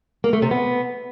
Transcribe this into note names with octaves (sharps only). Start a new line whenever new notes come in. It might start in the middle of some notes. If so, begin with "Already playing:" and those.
A#3
A3
C3
B3